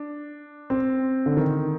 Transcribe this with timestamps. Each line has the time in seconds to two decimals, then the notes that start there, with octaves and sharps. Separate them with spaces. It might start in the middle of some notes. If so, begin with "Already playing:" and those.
Already playing: D4
0.70 C4
1.26 D3
1.37 D#3